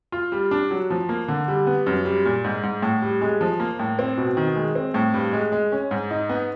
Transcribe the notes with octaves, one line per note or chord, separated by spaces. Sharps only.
F4
G3
D4
F#3
F3
A#3
D3
G3
B3
F#2
G3
A#2
G#2
G#2
A2
G3
G#3
F3
A#3
A2
C4
B2
D#3
G#3
C4
A2
G2
G#3
G#3
C#4
G#2
D#4
B3